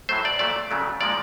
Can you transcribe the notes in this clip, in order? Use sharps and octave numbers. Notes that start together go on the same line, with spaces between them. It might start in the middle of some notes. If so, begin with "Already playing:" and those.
A2 F#3 A3 C5
D5
A#2 F#3 A3 D5
C#3 F#3 A3
A#2 F3 G#3 D5